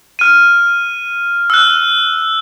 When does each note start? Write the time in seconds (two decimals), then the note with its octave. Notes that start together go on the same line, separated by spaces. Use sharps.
0.19 F6 D#7
1.50 E6 F#6